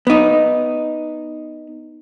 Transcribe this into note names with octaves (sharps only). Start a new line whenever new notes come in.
B3 D#4